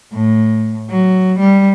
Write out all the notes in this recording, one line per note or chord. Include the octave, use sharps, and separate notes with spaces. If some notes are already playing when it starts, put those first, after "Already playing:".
A2
F#3
G3